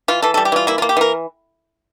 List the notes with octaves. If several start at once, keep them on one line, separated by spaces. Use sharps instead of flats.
E3 F4
E3 A4
G3 A4
G4
E3 F4
A#3 E4
A#3 F4
G4
E3 A#4